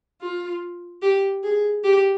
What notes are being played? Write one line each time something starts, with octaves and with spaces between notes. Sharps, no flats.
F4
G4
G#4
G4